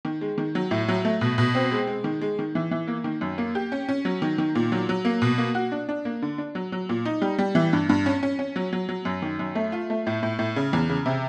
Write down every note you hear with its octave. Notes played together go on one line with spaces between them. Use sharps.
D#3
G#3
D#3
F#3
A2
F#3
A3
B2
B2
C4
G#3
G#3
D#3
G#3
D#3
E3
E3
A#3
D#3
F#2
A#3
G4
C#4
C#4
F#3
D#3
D#3
A#2
F#3
F#3
A#3
B2
A#3
F#4
D4
D4
A#3
D3
D4
F#3
F#3
A#2
D#4
G3
G3
E3
G2
G2
C#4
C#4
C#4
F#3
F#3
F#3
F#2
D#3
F#2
A3
F4
A3
A2
A2
A2
C#3
E2
C#3
C3